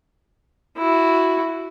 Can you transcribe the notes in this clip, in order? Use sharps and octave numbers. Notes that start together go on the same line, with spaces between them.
E4 F#4